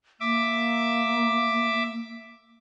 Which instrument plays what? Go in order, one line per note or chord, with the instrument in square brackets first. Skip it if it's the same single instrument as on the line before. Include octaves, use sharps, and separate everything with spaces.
[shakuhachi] A#3 [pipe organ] E5 D6